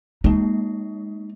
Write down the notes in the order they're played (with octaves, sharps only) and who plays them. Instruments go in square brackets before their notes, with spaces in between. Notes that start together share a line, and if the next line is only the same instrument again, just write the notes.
[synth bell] G#3 A#3 [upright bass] D#4